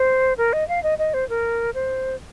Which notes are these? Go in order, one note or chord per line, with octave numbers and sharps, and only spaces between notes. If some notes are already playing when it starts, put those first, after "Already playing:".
Already playing: C5
A#4
D#5
F5
D#5
D#5
C5
A#4
C5